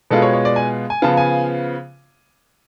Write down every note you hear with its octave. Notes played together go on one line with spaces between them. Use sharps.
B2 G#3 B3 F4 A4
C#5
C#5
D5
G#5
G#5
C#3 F3 B3 F4 A5
G#5